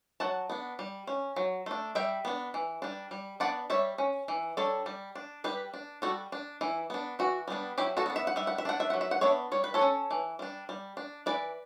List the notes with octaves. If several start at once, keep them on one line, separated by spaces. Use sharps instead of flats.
F#3 F#5 A5
B3 D4
G3
C#4
F#3
A3 D4
G3 E5 G5
B3 D4
E3
G3 D4
G3
B3 D4 D5 F#5
G3 C#5 E5
C#4
E3
G3 D4 A4 C#5
G3
D4
G3 G4 B4
D4
G3 F#4 A4
D4
E3 E4
B3 D4
E3 F#4
G3 B3 D4
F#3 E4 G4
F#4 A4
B3 D4
E5
F#5
G3 E5
F#5
E5
D4 F#5
E5
F#3 F#5
E5
F#5
B3 D4 C#5 E5
G3 C#5
B4
A4 C#5
C#4
E3
G3 D4
G3
D4
E3 B4 D5